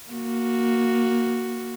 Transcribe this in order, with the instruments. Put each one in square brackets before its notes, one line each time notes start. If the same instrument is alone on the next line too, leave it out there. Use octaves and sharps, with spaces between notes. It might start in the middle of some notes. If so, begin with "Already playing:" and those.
[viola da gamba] A#3 F#4